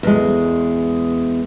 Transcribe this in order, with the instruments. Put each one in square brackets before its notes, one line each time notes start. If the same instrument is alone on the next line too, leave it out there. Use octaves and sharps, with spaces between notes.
[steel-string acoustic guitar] E2 G#3